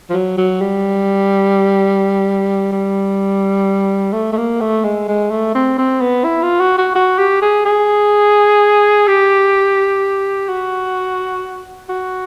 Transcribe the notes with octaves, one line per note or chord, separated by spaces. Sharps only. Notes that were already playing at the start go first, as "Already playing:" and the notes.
F3
F#3
F#3
G3
G3
A3
A3
A#3
A3
G#3
G#3
A3
C4
C4
B3
E4
F4
F#4
F#4
F#4
G4
G#4
G#4
G4
F#4
F#4